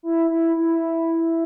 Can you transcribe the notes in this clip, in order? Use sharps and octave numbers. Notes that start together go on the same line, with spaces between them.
E4
E4
E4